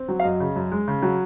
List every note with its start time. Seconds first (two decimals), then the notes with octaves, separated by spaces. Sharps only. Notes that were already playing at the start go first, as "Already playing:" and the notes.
Already playing: C4
0.09 F#3
0.20 F5
0.24 F#2 D#5
0.40 C#3
0.56 F#2
0.72 G#3
0.88 C#3
1.02 F#3